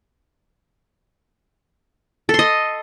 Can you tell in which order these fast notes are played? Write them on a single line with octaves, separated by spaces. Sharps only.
A4 C6 D#5